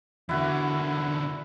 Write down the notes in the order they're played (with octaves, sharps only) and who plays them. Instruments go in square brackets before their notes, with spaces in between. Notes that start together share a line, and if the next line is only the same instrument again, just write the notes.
[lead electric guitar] E2 D3 [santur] E4 F#4 A#4